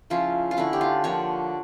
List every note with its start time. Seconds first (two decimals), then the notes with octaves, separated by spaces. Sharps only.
0.10 C#3 F3 C#4 E4 F4
0.51 F4
0.57 D3 A3 C#4 E4
0.73 G4
0.81 F4
1.04 D3 F3 A#3 C#5